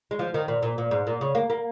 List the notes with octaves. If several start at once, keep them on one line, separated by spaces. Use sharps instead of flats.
G#3
F3
D#3
A#2
A#2
A#2
G#2
A#2
C#3
A#3
A#3